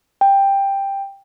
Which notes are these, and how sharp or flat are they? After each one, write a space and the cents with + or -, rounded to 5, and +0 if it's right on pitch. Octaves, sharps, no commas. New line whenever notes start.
G5 +10